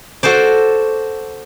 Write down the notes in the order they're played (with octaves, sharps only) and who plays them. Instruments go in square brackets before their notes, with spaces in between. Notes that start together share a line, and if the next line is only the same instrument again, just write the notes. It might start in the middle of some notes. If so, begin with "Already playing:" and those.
[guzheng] F#4 A4 C5 D5